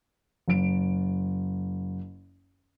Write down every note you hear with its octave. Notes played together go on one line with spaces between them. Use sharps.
F#1 D7